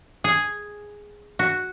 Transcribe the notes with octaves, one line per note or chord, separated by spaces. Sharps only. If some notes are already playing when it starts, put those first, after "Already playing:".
G#4
F#4